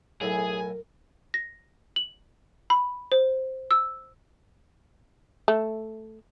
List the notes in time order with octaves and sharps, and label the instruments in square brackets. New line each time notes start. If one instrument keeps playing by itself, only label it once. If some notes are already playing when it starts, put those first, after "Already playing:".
[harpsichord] B1 A2 E4 [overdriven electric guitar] G#4 [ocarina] A#4 [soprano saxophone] G#5
[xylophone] A#6
F#7
B5
C5
E6
[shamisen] A3